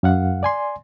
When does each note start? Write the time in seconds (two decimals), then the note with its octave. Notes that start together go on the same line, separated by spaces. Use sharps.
0.03 F#2 F5 F#5
0.43 D5 G#5 C6